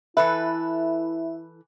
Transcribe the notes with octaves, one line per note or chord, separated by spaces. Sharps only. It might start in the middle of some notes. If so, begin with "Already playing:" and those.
E3 E4 A4 B4 E5